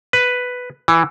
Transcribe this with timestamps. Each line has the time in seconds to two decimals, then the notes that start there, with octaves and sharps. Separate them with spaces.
0.13 B4
0.88 E3